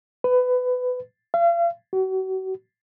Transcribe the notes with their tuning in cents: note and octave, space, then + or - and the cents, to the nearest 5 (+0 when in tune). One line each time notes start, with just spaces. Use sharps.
B4 +20
F5 -40
F#4 +35